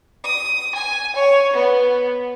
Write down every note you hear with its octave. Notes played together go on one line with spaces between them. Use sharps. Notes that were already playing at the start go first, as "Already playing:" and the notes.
D#6
G#5
C#5
B3